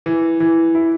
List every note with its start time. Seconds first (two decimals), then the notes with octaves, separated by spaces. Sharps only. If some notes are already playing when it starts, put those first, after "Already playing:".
0.06 E3
0.40 E3
0.75 E4